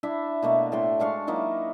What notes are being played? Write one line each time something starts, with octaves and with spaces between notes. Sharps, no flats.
D4 E4 E5
B2 A3 A#3
A2 A4 G5 C6
G#3 D4 F5 C#6
F#3 A#3 D#4 E4